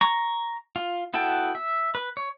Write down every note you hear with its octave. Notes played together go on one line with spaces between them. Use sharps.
A#5 C#6
F4
B3 E4 F#4 A4 G5
E5
B4
C#5